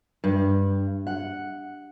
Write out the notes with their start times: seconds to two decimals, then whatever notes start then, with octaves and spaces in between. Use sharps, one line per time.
0.24 G2
1.07 F#5